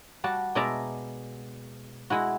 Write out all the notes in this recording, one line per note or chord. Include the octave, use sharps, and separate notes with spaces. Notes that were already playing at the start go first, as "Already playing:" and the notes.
G3 F#4 A5
B2 G#3 D5 E5 A5 A#5
G#3 E4 F#4